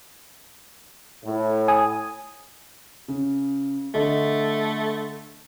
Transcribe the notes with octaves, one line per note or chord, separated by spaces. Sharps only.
A2
G#5 D#6
C#3
D3 A3 D#5